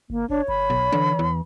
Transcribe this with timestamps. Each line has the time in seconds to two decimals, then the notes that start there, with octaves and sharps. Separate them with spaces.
0.10 G1 A#3
0.30 G1 D4 C#5
0.48 G1 B5
0.70 B1
0.92 D3 E3
1.19 E2